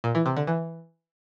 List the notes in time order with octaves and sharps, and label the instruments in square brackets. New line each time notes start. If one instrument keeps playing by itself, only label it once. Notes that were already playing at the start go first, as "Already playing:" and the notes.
[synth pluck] A#2
E3
C3
D3
E3